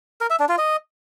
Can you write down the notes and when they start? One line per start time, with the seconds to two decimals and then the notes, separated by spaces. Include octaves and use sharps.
0.21 A#4
0.30 E5
0.40 D4
0.49 F4
0.58 D#5